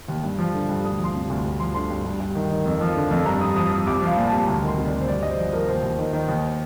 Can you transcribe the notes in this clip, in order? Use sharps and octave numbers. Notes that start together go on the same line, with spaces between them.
D#2
G2
F3
D3
G2
D2 D#6
F3 C6
C3
D2
G2
F3 C6
D3 C6
G2
G2
G2
D#3
D#3
F2
F3
D3
F2
G2 A#5
G2 D#6
F3 D#6
F3 D#6
C2 D6
F3 F5
A#2
A5
C2
D2 A#5
D#3
C6
C3
D5
D2
C5
G2 D5
G2 D#5
C5
F3 D5
F3 A#4
D#2 C5
D#2
D#3
D#3
D#2